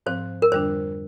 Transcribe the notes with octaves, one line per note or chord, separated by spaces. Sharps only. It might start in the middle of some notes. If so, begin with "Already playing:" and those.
G#2 F3 C4 C5
A#4
F2 D3 G3 D4 C5